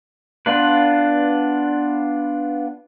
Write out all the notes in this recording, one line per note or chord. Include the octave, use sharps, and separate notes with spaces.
B3 D4 F4 B4